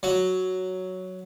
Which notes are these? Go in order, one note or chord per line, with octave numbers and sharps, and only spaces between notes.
F#3